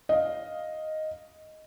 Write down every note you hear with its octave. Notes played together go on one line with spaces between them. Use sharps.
D#5 F5